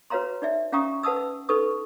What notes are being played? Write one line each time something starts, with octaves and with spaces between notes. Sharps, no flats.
F#4 B4 C#5 F5 A#5 C6
D#4 D5 E5
C#4 F5 G5 A#5 C#6 D#6
B4 F#5 A5 D#6 E6
E6
D#4 A4 B4 C#6 D#6